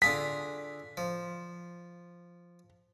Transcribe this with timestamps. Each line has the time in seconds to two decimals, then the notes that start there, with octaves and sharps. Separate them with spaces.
0.02 D3 F4 G#4 B6
0.97 F3